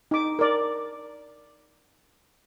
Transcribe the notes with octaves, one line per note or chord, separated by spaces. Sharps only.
D#4 D6
A#4 D5